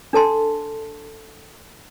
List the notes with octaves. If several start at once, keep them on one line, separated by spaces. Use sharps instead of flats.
D4 A4 A5 C6